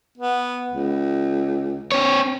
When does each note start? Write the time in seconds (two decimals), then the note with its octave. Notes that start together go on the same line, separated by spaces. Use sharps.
0.18 B3
0.68 C#2
1.92 C4 C#5